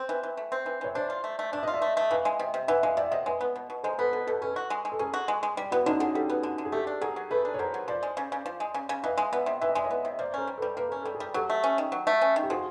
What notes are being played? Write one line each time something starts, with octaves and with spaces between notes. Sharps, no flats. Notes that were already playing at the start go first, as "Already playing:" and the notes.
Already playing: C4
E3
E3
A3
C4
E3
E3 C#5
D4 C5 D5
F4
A3
A3
D4 E5
F4 D#5
D5 E5
A3
A3
E3 D#5 F5
G#3
C3
C3
E3 E5 F#5
G#3 D#5 F5
C3 D5 E5
C3 C#5 D#5
G#3 B4 C#5
B3
B2
B2
G#3 A#4 C5
B3 A4 B4
B2 A4 B4
B2 A4 B4
C#4 A4 B4
F#4
G#3
G#3
A4
C#4 G#4 A#4
F#4
G#3
G#3
G3
B3 E4 F#4
D3 C#4 D#4
D3 F#4 G#4
G3 G4 A4
B3
D3
D3
G#4
A3 G4 A4
D4
F#3 G#4 A#4
F#3
A3 A4 B4
D4
C#5
F#3 A#4 C5
F#3
F3 C5 D5
G#3
C#3
C#3
F3
G#3
C#3
C#3
E3 D#5 F5
G#3
B3 D5 E5
C3
E3 E5
D#5
G#3 D5
C#5 D#5
B3
C3
A#3 C5 D5
C#4 A#4 C5
G3
G3 A4 B4
A#3 B4
C#4 A#4
G3 A4
G#4 A#4
G3
F#3 G4 A4
A3
C#4
D#3
F#3
A3
C#4
D#3
G4
F3 F#4 G#4